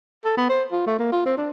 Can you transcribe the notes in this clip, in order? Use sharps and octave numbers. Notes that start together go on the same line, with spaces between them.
A4
B3
C5
F4
A3
A#3
F4
C4
D4